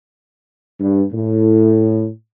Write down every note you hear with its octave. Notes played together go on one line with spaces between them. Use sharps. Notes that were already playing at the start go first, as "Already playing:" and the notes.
G2
A2